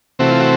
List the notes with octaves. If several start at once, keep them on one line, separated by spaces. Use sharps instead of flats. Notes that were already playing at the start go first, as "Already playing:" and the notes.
C3 E3 A3 C4 F#4
F4
F#4